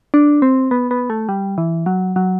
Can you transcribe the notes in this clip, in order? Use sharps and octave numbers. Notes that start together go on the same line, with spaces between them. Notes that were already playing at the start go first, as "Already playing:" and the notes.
D4
C4
B3
B3
A3
G3
E3
F#3
F#3